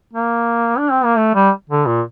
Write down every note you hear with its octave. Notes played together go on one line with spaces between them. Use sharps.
A#3
D4
C4
A#3
A3
G3
D3
A#2